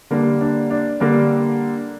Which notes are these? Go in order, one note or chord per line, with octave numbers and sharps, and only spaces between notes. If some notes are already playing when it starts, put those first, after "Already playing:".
D3 G3 A#3 D4
D4
D4
D3 G3 A#3 D4